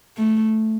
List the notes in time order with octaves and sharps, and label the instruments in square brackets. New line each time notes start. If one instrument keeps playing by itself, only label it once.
[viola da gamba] A3